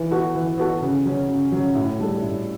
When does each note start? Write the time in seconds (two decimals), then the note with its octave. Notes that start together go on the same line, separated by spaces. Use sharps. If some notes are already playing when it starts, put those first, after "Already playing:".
Already playing: E3
0.11 B3 F#4 A4
0.35 E3
0.58 B3 F#4 A4
0.82 C#3
1.05 F#3 C#4
1.28 C#3
1.52 F#3 C#4
1.75 A2
1.99 G3 D4 A4
2.22 A2